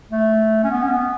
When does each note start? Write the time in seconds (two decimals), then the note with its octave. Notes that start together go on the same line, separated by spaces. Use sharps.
0.11 A3
0.64 C#4
0.71 B3
0.83 C#4
0.91 B3